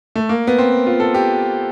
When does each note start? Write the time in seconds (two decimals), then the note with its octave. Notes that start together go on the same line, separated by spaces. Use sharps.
0.15 A3
0.29 A#3
0.47 B3
0.58 C4
0.86 F4
1.00 A4
1.14 G4